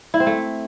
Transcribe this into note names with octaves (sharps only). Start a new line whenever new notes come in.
E4
C4
A3